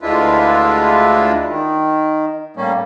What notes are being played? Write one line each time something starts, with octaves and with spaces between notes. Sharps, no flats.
D2 G#3 D4 E4 F4 B4
D#3
A2 G3 A#3 C#4